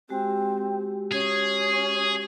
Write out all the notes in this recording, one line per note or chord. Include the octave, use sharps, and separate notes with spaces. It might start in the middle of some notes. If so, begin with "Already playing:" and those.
G#3 C4 F#4 G4
C#4 G#4